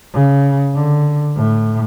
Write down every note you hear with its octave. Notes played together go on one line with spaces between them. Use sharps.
C#3
D3
A2